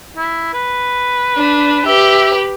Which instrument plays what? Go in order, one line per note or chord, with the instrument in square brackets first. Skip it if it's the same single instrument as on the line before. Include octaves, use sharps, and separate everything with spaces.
[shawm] E4
B4
[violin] D4
[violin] G4 B4 [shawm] E5